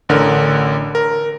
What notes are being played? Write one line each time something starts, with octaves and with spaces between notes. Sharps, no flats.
A1 D3 A#4 F6
A#4